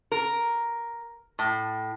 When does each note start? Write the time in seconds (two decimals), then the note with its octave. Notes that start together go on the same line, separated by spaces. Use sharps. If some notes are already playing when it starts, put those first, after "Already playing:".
0.12 A#4
1.39 A2